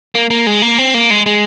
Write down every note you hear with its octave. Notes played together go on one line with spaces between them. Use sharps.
A#3
A#3
G#3
A#3
C4
A#3
G#3
G#3